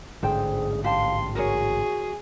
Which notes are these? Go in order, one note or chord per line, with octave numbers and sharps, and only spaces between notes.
A1 G#2 D3 G#4 C5 G5
G4 F5 A5 C6
F#4 G#4 A#4 C#5